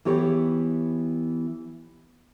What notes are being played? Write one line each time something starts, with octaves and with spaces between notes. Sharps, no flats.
E3 B3 G4 C#5